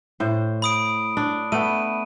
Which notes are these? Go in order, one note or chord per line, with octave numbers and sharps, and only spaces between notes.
A2 C5
B5 D#6 D7
D4
A3 B3 D#7